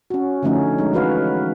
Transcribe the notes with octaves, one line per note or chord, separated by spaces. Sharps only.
C#4 F#4
D3 F3 A3 C#4 D#4
G#3 D#4
E3 F#4 B4 F5